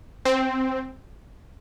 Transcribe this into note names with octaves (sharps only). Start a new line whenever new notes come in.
C4